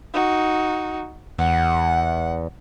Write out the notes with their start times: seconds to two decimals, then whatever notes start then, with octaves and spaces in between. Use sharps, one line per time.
0.14 D#4 F#4
1.38 E2 F#5